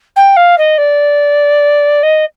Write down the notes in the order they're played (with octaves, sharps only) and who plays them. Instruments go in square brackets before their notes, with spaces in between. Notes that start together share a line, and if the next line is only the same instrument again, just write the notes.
[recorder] G5
F5
D#5
D5
D#5